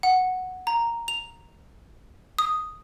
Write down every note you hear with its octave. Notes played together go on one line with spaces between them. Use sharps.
F#5
A#5
F7
D#6